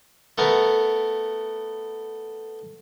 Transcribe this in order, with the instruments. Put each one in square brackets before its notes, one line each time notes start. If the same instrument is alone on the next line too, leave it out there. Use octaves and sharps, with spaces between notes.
[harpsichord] A3 B3 A#4